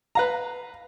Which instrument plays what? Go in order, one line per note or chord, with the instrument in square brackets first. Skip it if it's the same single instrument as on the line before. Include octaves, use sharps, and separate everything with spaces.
[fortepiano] B4 F5 A#5